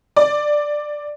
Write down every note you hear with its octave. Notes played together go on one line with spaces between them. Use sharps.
D5